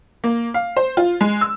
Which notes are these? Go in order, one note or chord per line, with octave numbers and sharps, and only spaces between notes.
A#3
F5
C5
F4
G#3
E6